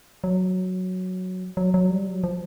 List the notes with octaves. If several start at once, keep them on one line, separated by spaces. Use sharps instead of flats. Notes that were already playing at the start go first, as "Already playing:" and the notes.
F#3
F#3
F#3
G3
F#3
F3